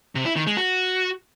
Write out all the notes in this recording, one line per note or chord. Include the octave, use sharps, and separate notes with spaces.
C3
E4
D#3
G#3
F#4